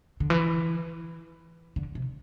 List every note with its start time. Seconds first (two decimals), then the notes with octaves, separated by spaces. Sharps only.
0.20 D3
0.30 E3
1.76 D3
1.95 C3